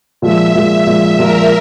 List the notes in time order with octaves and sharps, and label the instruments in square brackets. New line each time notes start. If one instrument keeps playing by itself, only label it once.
[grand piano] A#2 F3 G#3 [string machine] E5
[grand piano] A#2 F3 G#3
A#2 F3 G#3
[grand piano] A#2 F3 G#3 [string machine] A#4